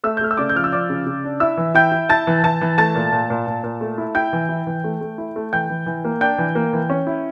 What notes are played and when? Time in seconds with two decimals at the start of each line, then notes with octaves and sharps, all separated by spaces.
0.04 A3 E5 E6
0.17 G6
0.21 A3 F6
0.31 E6
0.37 C#3 D5 D6
0.49 G6
0.55 F3 F6
0.64 E6
0.72 F3 D5 D6
0.90 C#3
1.06 C#3
1.24 D4
1.40 E4 E5 E6
1.57 E3
1.75 E4 G5 G6
1.92 E4
2.09 E4 A5 A6
2.27 E3
2.43 E3 A5 A6
2.61 E3
2.78 A3 A5 A6
2.95 A#2
3.12 A#2
3.30 A#2
3.47 A#2
3.64 A#2
3.81 A3
3.98 E4
4.15 E4 G5 G6
4.33 E3
4.49 E4
4.67 E3
4.84 A3
5.01 A3
5.18 E4
5.36 A3
5.53 E3 G5 G6
5.70 E3
5.86 E3
6.04 A#3
6.21 D4 G5 G6
6.38 E3
6.55 A#3
6.73 E3
6.90 C#4
7.07 E4